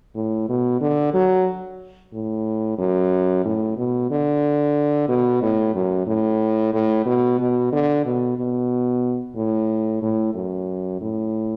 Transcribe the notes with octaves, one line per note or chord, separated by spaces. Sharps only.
A2
B2
D3
F#3
A2
F#2
A2
B2
D3
B2
A2
F#2
A2
A2
B2
B2
D3
B2
B2
A2
A2
F#2
A2